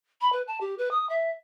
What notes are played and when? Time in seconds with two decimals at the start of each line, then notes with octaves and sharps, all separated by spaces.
0.21 B5
0.32 B4
0.47 A5
0.60 G4
0.78 B4
0.91 D#6
1.09 E5